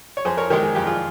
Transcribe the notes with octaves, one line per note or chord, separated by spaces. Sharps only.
C#5
F2 G#4 C5
A#4 C#5
D#3 G#3 G4 A#4
G#4
F2 G4
F4 G#4